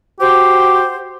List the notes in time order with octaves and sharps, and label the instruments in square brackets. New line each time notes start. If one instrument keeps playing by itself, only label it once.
[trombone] F#4 [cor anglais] G4 [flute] C5